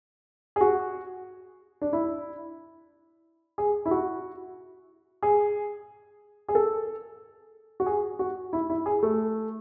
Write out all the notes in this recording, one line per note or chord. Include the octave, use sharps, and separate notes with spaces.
G#4
F#4
D4
E4
G#4
E4
F#4
G#4
G#4
A4
F#4
G#4
F#4
E4
E4
G#4
A3